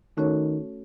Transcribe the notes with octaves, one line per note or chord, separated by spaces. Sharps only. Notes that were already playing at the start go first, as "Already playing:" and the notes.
D#3 A3 C#4 F#4 A4 C#5